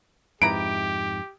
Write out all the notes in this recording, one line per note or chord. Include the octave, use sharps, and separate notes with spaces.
F2 G#2 E4 G4 B4 A#5 D7